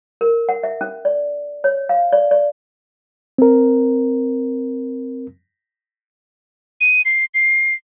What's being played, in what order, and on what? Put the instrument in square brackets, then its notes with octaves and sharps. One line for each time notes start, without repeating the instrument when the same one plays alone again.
[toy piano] A#4
F#5
E5
C#4
D5
C#5
F5
D5
D5
[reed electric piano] C4 A#4
[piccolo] D#7
C7
C7